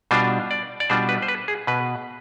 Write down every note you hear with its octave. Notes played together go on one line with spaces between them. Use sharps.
B2 G3 D4 F4 C5
D5
D5
B2 G3 D4 F4 C5
B4
C5
B4
G#4
B2 B4